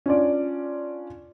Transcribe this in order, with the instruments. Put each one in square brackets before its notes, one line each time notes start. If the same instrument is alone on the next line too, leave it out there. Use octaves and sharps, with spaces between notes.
[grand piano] C#4 D4 F4 D5